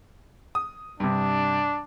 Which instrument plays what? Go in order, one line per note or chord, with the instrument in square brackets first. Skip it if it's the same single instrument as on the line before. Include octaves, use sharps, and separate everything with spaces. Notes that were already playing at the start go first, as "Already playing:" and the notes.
[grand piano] D#6
[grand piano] G2 C3 [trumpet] D4